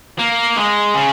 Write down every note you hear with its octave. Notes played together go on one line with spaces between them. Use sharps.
A#3
G#3
C#3